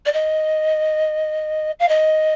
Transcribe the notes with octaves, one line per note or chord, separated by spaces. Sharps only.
D5
D#5
F5
D#5